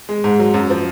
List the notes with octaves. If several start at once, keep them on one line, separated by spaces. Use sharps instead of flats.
G#3
G#2
F#3
F#2
F3